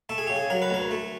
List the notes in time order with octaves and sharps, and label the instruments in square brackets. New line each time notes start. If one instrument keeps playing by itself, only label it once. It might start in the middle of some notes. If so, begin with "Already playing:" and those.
[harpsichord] A3 A4
G#4
C#3 G4
G#4
F#3 A#4
B4
D2 A#4
A3